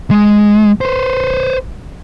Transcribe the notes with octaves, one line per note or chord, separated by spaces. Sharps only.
G#3
B4 C5